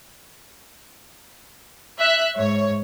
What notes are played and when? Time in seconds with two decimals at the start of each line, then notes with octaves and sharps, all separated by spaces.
2.00 E5 F#6
2.37 G#2 C#5